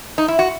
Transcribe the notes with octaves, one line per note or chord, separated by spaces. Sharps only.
D#4
E4
F#4